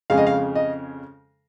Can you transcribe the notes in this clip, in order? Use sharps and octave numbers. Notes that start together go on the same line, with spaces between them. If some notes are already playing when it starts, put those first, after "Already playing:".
F2 C#3 G#3 F5
D#5
F5
D#5